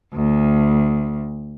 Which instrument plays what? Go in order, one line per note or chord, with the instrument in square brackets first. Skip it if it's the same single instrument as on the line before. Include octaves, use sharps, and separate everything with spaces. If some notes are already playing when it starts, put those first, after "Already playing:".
[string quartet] D2